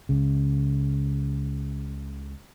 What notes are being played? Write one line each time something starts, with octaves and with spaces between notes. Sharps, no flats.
C#2 C#3